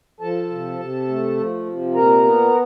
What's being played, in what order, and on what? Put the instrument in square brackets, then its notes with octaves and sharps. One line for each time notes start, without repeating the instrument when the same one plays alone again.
[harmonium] F3 A4 A5
C3
C3
A3
F3
C3
A#2 A#4 A#5
B3